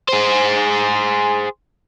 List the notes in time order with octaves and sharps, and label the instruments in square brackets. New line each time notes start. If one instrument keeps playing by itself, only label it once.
[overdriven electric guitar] G#4 C5